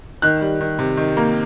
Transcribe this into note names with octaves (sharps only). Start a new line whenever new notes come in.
D#3 F#6
G3
D#3
C3
D#3
A#3